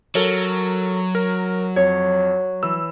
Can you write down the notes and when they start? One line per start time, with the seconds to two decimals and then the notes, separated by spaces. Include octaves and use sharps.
0.15 F#3 A4 A#4 C#5
1.15 A#4
1.76 F2 C#5
2.63 E3 E6